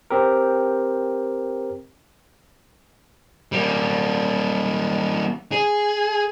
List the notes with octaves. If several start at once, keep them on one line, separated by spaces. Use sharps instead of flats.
C4 G4 A#4
G3 A#3
G#4